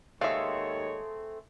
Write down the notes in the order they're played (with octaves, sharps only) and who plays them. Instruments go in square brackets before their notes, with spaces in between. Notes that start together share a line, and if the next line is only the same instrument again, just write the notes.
[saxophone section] D#2 G#3 C#5 [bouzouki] A3 C4 G#4 [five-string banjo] E5 F5